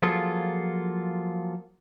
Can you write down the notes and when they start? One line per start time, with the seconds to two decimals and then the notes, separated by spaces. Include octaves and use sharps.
0.02 F3 F#3 A#3 F4 G#4 A4